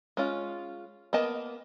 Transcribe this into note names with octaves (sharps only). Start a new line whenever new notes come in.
G#3 C#4 F4
A#3 B3 D#5 A5